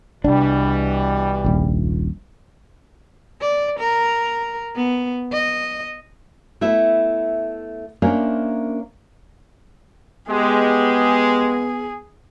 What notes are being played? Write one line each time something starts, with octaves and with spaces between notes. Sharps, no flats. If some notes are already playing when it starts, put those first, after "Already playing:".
C2 B2 E3 G3 D4
D#1 A#1
D5
A#4
B3
D#5
A3 B3 E4 E5
A#3 C#4 D4 A#4 C5 E5
G#3 B3 G4 G#4